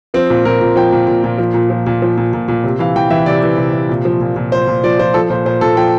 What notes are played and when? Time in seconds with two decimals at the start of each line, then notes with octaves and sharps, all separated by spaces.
0.14 F3 C4
0.30 A#2
0.45 A#2 A#4
0.61 A#2
0.76 F3 G5
0.92 A#2
1.07 A#2
1.24 A#2
1.38 F3
1.54 A#2
1.70 F3
1.86 A#2
2.02 F3
2.18 A#2
2.33 A#2
2.48 A#2
2.64 C3
2.79 E3 F5
2.96 E3 G5
3.10 E3 E5
3.26 C3 D5
3.43 E3
3.58 C3
3.73 C3
3.89 A#2
4.05 F3
4.21 A#2
4.36 A#2
4.52 F3 C5
4.67 A#2
4.84 F3 D5
4.99 F3 C5
5.14 F3 A4
5.30 A#2 C5
5.45 A#2 C5
5.61 A#2 A4
5.77 F3 G5